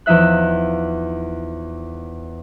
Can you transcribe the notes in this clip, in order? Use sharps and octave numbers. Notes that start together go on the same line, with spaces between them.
E2 F3 D#4 E5 F#6